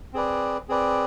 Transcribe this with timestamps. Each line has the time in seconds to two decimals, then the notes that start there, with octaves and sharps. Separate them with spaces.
0.13 C4 G#4 B4 D5
0.69 C4 G#4 B4 D5